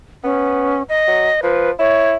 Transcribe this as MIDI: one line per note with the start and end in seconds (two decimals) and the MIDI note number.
0.24 0.80 59
0.24 0.83 61
0.89 1.41 75
1.07 1.30 54
1.43 1.70 53
1.43 1.71 71
1.79 2.16 64
1.79 2.11 73